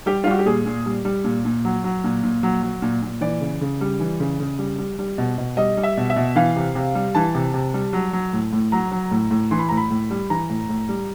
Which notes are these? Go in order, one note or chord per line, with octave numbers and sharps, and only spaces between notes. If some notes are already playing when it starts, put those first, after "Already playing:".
G3 G4
F4
G3 F#4
G4
A#2 G#4
A#2
G3
G3
A#2
A#2
F#3
F#3
A#2
A#2
F#3
F#3
A#2
A#2
E3 D5
C#3
C#3
G3
E3
C#3
C#3
G3
G3
G3
B2
B2
G3 D#5
G3
E5
B2
E5
B2
E3 F5
C3
C3
G3
E3 A5
C3
C3
G3
F#3
F#3
A2
A2
F#3 A#5
F#3
A2
A2
E3 C6
B5
A2 A#5
B5
A2
G3
E3 A#5
A2
A2
G3